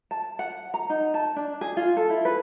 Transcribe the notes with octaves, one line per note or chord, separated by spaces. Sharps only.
A5
F#5
A#5
D#4
A5
D4
G#4
F4
A4
E4
B4